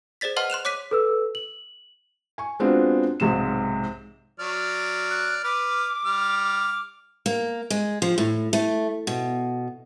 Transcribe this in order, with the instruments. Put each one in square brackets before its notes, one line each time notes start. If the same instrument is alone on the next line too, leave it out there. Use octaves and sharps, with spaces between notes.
[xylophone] G#4 C5 D5 A6 B6
B4 D#5 F#5 A5 C6 F6
C6 F#6 E7 F7
C#5 D6 F#6 B6 D#7
[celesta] A4 B4 E6
F#7
[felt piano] G#5 C#6
G#3 B3 C4 D4 F4 F#4
B1 G#2 C3 G#3 E7
[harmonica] F#3 D5 F6
[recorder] F#6
[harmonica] B4 F6 [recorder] D6
[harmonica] G3 F6
[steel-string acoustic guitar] A#3
G#3
F3
A2
A3
B2